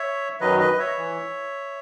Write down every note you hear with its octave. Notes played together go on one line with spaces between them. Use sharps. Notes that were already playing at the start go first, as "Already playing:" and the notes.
Already playing: C#5 E5
F#2 D#3 F#3 B4 D#5
B4 D#5
D#5
C#5 E5
E3